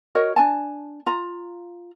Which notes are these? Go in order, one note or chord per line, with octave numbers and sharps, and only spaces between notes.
F#4 A#4 C#5 D#5
D4 G#5 A5
F4 A#5